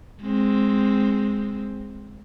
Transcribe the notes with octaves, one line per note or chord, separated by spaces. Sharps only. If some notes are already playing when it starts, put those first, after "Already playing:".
G#3 C4